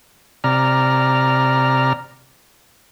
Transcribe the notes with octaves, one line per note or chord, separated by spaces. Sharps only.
C3 D5 A#5 F6